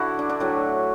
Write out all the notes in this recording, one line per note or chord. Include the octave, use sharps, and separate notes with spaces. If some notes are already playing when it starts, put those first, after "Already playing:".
Already playing: D3 E4 F#4
D4
D4
A2 F#3 A3